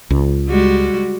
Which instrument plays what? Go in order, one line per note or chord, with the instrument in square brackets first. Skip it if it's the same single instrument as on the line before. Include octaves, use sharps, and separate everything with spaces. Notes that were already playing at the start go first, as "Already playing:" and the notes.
[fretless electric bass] C#2
[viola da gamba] G3 G#3 F#4